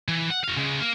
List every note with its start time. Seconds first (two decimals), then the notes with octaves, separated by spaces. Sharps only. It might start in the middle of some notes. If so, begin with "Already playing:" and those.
0.08 E3
0.30 F#5
0.43 F#4 F5
0.57 C#3 G#3
0.80 A#3